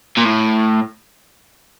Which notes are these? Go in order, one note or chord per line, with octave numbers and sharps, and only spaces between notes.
A#2
A2